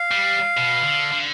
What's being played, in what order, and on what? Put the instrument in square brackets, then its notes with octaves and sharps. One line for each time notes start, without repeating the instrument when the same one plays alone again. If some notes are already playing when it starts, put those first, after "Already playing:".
Already playing: [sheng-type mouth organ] F5
[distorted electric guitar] G3
B2
D3
D3